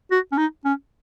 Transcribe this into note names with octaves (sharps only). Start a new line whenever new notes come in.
F#4
C#4
D#4
C#4